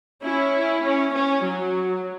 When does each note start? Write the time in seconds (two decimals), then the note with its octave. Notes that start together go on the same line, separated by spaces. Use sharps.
0.24 C#4 E4
0.84 C#4
1.14 C#4
1.45 F#3